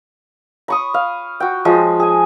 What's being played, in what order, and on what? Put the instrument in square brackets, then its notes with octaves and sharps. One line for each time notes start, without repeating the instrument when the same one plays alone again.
[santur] B5 C#6 D#6
F5
F#4 G5
F3 G#3
G#4 G#5